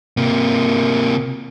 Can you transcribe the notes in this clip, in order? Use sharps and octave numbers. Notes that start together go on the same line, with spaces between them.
C3 A#3